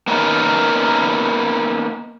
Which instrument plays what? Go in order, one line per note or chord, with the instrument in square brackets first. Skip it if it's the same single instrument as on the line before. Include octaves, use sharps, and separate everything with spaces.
[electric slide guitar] A#3 B3 C#4 D#4 A#4